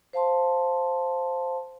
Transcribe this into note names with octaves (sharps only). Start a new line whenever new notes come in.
C5 F5 A5 C6